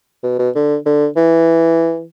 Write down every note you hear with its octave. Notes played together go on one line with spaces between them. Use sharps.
B2
B2
D3
D3
E3